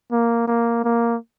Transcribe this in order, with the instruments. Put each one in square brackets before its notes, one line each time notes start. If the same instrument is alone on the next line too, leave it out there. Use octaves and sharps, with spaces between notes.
[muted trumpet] A#3
A#3
A#3